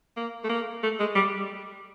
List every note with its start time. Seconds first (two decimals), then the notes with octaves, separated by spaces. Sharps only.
0.17 A#3
0.44 A3
0.49 A#3
0.83 A3
1.00 G#3
1.15 G3